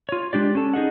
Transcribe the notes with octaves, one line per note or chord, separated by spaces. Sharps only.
F4 C#5
G#3 D4 G4 D5
C#4 A4
D#4 G#4 D#5 F#5